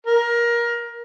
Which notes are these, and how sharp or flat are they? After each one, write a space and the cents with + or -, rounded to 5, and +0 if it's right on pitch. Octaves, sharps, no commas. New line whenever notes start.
A#4 +20